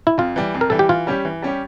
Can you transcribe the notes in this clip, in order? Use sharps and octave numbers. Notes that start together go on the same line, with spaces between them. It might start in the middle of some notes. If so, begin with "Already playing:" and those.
E4
F2 F4
E3 G3
F2
A#4
E3 G3 A4
G4
E3 F4
G3 C#4 G4
E3
G3 C#4 G4